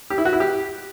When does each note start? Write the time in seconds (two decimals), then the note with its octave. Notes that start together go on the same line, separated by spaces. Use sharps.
0.10 G4
0.18 E4
0.25 F#4
0.33 E4
0.40 G4